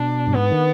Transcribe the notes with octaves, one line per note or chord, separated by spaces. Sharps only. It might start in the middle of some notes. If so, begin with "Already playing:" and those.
Already playing: B2 D4
G2
G#2 B3
D#3